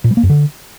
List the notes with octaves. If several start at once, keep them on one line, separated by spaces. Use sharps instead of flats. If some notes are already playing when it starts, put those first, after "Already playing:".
A#2
G3
A#3
F#2
D3